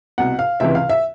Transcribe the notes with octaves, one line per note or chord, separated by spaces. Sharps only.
C2 B2 F#5
F5
C#2 C3 E3 E5
F5
E5